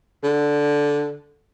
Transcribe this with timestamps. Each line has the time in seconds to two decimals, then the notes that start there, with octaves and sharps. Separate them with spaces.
0.24 D3